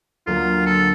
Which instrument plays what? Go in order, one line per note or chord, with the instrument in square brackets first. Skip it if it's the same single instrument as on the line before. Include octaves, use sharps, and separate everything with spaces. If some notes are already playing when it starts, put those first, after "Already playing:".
[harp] D2 F#3 A#3 [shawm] F4
[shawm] A4